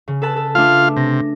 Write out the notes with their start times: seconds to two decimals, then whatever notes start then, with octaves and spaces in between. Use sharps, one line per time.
0.08 C#3
0.22 A4 B4 A5
0.36 A4
0.55 A3 D4 F4 F5
0.96 C3 A#6